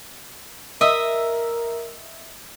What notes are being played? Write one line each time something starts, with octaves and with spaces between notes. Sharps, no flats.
A#4 D#5 E5